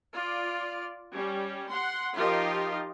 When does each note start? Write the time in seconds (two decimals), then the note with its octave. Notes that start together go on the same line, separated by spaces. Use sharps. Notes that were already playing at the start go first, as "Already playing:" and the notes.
0.14 F4 D5
1.12 G3 C#4
1.70 F#5 C6
2.17 F3 D#4 F4 G4 A#4 D#5